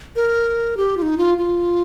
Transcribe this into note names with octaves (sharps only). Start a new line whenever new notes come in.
A#4
G4
F4
D#4
F4
F4